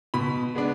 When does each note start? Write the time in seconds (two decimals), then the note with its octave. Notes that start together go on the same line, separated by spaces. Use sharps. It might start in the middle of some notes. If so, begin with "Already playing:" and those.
0.14 B2 B5
0.55 G#3 B3 D4